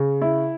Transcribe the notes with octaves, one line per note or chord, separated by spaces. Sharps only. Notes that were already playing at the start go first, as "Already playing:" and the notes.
Already playing: C#3
E4